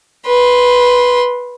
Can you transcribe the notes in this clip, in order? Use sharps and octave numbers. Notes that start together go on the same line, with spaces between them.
B4 C6